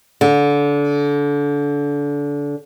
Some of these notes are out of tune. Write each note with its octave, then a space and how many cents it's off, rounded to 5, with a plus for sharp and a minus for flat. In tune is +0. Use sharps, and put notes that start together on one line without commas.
D3 -25